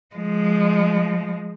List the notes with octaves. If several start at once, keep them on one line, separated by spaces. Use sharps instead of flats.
F3 G#3